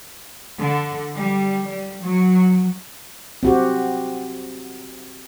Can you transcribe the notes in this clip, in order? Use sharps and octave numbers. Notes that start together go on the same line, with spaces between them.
D3
G3
G3
F#3
C4 F#4 G4